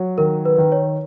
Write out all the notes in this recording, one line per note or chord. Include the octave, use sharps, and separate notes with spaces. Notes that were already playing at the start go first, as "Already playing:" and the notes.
Already playing: F#3
D#3 A#4
B4
D#3
C#5